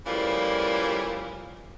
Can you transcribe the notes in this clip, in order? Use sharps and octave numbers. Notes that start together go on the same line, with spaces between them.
C#3 E3 F3 G3 A3 A#3